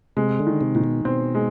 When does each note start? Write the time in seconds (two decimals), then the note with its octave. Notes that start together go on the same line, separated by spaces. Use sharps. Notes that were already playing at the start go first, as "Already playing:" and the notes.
0.17 C3 G#3
0.39 D3
0.47 D#3
0.61 C3
0.75 A#2 D#3
0.84 B2
1.05 B2 C4
1.35 G#3